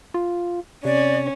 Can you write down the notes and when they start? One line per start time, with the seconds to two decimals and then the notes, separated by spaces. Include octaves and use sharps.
0.14 F4
0.85 C3 C#4 D5